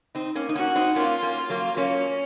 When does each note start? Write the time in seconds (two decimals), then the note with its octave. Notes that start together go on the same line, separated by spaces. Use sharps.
0.15 C4 D#4
0.35 A#3 C#4
0.49 D#4
0.55 A#3 C#4 F#4
0.75 C4 D#4
0.96 A#3 C#4 F4
1.22 A#3 C#4
1.50 F#3 A#3
1.76 F#3 A#3 C#4